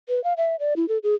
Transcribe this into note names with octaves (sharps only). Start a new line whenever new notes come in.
B4
F5
E5
D5
E4
A4
G#4